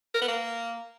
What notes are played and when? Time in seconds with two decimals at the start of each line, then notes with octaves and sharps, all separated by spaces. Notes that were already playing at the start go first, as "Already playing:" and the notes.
0.15 A#4
0.22 B3
0.28 A#3